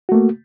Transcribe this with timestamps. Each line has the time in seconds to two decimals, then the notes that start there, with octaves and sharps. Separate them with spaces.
0.09 F#4
0.12 A3
0.15 A#3